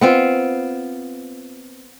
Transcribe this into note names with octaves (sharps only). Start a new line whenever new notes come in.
B3 C4 F4